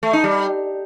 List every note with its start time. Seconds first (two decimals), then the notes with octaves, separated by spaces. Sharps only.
0.03 A3
0.13 D#4
0.24 G3